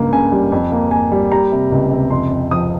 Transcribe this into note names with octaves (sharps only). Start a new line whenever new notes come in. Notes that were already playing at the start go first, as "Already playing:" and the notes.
Already playing: C#2 G2 A#3
C#3 G#5
G3
F2
A#3
A#3 G#5
G3
G3 A#5
C3
C#2
C3
F2 C6
F2
F3 D#6